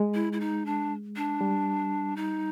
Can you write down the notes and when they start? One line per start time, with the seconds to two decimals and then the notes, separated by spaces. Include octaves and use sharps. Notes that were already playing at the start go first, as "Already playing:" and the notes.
Already playing: G#3
0.14 E4
0.32 E4
0.40 D#4
0.66 D4
1.16 D4
1.41 G3
2.16 D#4